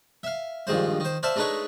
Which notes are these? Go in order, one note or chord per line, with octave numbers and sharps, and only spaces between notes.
E5 F5
A#1 G2 D#3 G#3 C5
D#3 C5
C5 D5 E5 F5 A5
G#3 A3 D4 D#4 B4 C#5